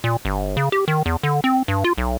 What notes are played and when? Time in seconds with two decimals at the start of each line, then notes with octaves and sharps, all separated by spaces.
0.04 A#2
0.25 G1
0.57 C#3
0.72 G4
0.88 D#3
1.06 E2
1.23 D3
1.44 C4
1.68 G2
1.84 F4
1.98 B1